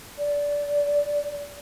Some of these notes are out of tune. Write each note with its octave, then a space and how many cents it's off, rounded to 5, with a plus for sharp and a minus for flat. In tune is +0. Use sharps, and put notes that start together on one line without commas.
D5 -20